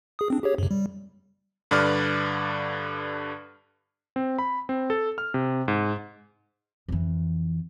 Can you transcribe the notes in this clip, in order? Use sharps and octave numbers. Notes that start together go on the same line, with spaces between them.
G#4 D#6
C4 D4
G4 G#4 C#5
F#2 C3
G3
G2 D3 B4 D5 F6
C4
B5
C4
A4
F6
C3
G#2
F2 E3